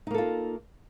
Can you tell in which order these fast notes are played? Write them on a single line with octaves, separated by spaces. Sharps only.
D#4 A#3 A4 F4